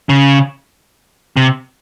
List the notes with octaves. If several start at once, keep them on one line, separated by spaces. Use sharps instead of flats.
C#3
C3